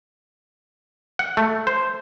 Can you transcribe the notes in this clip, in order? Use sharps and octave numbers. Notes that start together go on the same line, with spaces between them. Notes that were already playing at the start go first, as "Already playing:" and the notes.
F#5
A3
C5